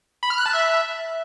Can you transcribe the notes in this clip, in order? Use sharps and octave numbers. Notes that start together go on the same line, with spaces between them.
B5
F6
F#6
A5
E5